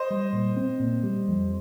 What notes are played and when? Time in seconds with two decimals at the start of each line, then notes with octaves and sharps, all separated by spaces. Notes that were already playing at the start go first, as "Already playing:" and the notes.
Already playing: C5 D#5
0.10 G3
0.33 A#2
0.56 C4
0.80 A#2
1.03 G3
1.28 F2